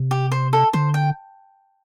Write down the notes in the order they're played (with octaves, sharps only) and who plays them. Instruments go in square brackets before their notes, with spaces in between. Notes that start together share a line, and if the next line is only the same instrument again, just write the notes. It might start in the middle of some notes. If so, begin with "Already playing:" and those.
Already playing: [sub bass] C3
[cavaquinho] G4
C5
A4
[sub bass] D3 [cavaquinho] C5
[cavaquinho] G5